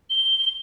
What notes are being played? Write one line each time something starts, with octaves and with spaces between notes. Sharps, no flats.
G7